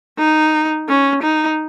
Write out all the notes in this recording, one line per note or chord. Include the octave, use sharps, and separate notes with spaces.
D#4
C#4
D#4